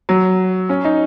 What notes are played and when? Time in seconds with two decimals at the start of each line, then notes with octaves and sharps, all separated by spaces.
0.09 F#3
0.69 C#4
0.85 D#4